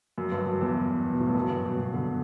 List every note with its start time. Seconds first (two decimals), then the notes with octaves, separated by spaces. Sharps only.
0.18 F#2
0.32 G2
0.46 F#2
0.61 E2
1.12 B2
1.20 A2
1.28 G2
1.35 F#2
1.50 G2
1.65 B2
1.79 B2
1.94 D3